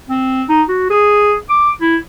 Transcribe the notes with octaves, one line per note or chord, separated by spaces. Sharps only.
C4
D#4
F#4
G#4
D6
E4